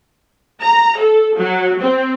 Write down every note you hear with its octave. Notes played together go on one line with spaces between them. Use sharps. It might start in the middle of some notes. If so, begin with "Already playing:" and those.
A#5
A4
F#3
C4